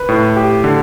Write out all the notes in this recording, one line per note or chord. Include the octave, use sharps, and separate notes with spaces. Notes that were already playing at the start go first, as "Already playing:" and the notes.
Already playing: B4
A2
G4
D3